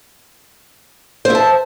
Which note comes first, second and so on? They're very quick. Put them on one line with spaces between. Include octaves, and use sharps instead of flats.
C5 E5 A5